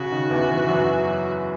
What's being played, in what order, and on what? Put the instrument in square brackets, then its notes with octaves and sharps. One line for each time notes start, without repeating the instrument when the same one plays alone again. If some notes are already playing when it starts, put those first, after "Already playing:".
Already playing: [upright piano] C#3 [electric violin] F#4
[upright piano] D#3
E2 E3
E2 E3
E3
F#2 F#3